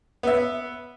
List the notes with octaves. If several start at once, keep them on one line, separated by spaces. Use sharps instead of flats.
B3 E5